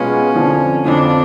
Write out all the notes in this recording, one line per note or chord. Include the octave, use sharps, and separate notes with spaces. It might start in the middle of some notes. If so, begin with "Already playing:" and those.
Already playing: B2 G#3 B3 C#4 F4
F2 D3 F3
F2 D3 F3 D4